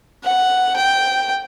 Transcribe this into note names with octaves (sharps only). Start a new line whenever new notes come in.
F#5
G5